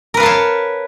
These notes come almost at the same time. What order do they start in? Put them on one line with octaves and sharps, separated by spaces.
A#4 B4 F5 A5 C#5